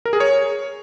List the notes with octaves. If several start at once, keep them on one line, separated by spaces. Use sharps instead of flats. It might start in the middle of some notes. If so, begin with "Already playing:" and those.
A#4
G#4
C#5